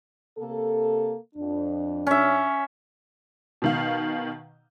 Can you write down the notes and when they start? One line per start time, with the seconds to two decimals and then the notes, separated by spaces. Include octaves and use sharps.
0.37 C3 A#3 A4
1.35 F2 D4
2.07 C#4 E5
3.62 B2 D#3 F5